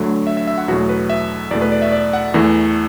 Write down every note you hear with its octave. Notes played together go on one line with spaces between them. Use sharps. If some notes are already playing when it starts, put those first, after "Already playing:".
Already playing: D2 D3 F#3 A3
E5
E5
E5
F#5
E2 B2 F#3 A3 F#4
B4
E5
E2 B2 A3 D5
B4
D5
E5
D5
F#5
E2 E3 A3